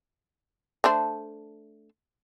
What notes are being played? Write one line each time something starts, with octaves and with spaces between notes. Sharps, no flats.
A3 D4 C5